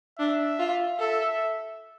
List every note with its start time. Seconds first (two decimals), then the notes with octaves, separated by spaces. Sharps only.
0.18 D4 E5
0.59 F4
0.99 A4 E5